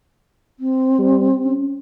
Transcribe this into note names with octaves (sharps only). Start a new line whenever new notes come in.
C4
G3
C#4